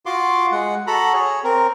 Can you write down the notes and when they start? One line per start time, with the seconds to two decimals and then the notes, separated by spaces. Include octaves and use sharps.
0.06 F4 F#4 C6 D6
0.52 G#3 F#5
0.87 F#4 A4 A#5 B5
1.13 G#4 C#5
1.44 C4 A#4